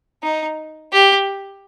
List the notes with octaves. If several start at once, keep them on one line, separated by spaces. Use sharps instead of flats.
D#4
G4